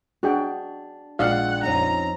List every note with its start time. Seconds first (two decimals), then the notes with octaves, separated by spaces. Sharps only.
0.23 D4 F#4 G#4 G5
1.19 A#1 G#3 D5 F5 F#5
1.63 F2 C#4 D#4 A#5